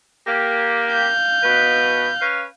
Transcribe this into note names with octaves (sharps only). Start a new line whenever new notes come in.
A#3 G4
F5 G6
B2 B4
C#4 B4 F5